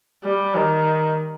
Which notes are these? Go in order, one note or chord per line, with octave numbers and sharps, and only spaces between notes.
G3
D#3